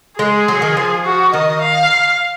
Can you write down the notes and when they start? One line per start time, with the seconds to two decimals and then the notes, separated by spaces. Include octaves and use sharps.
0.19 G#3 G#4
0.48 F#3
0.62 D#3
0.77 F3
1.05 F#4
1.33 D#3 D#5
1.62 F5